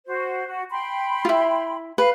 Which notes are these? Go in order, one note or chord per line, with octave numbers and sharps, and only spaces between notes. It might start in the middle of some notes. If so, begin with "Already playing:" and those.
F#4 C5
F#4
G5 B5 C6
E4 F4
B4 F5